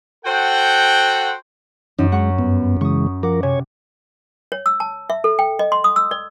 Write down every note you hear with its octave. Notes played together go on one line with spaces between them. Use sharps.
F#4 A4 C5 F#5 G5
F#2 E3 C#4 D#4
G#3 F#5 C#6
G2 B3
C#3 E3 G#3 C#6 D#6
F3 A#4 F#5 D6
C3 C#5 G#5
C#5
E6
A5
E5
A4
G5
D#5
C6
D#6
E6
D5